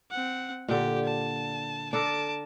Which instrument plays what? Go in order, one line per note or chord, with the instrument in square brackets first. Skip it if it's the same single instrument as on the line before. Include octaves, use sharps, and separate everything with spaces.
[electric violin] C4 F#5
[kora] A#2 D3 [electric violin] G4
[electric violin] A5
[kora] D4 A4 A#4 [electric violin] A5 D7